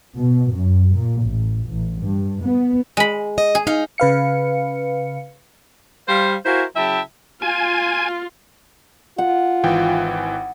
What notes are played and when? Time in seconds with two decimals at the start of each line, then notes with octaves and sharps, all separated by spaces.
0.17 B2
0.52 F#2
0.95 A#2
1.24 A1
1.67 A1
2.01 G2
2.44 B3
2.97 G#3 B5
3.38 D#5
3.55 G#4
3.67 D#4 F5
3.98 C#3 B4 F5 C#7
6.08 G3 C5 F5
6.46 E4 F#4 A#4 C5 F5 G#5
6.76 C#3 F#3 E4 E5 G5 A5
7.42 F4 G#5
9.18 F4 F#5
9.64 G#1 E3 G5